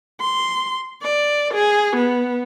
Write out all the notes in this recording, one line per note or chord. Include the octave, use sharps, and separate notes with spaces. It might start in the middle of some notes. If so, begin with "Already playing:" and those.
C6
D5
G#4
B3